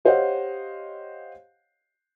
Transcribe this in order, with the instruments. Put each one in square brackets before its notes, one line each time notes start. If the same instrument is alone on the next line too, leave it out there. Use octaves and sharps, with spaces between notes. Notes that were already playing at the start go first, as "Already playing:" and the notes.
[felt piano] G4 C5 C#5 D#5 F5 F#5